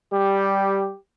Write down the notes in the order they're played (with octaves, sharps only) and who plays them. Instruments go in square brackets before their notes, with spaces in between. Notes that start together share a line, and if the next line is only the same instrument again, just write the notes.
[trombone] G3 [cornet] G4